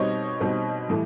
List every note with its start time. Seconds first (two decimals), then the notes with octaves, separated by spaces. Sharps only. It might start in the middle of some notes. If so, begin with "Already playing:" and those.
Already playing: B2 G3 C4 D#4 C#5 D#5
0.41 B2 G3 C4 D#4
0.89 A2 E3 G3